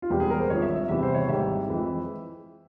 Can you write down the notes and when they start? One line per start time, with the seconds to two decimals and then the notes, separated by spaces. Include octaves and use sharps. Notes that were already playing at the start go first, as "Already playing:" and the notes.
0.02 F4
0.10 E1 E2 E3 G3 G4
0.20 G#4
0.30 A#4
0.39 C5
0.50 G#1 G2 F3 C#5
0.62 E5
0.76 E5
0.88 E2 C3 E3 G3 E5
1.03 C5
1.14 C#5
1.28 G#1 G#2 G3 E5
1.68 F2 E3 G#3